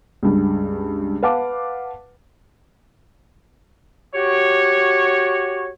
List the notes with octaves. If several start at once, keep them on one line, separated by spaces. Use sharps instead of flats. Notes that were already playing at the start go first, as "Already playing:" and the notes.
C#2 G2
B4 F5 F#5 A5 D6
F#4 G4 C#5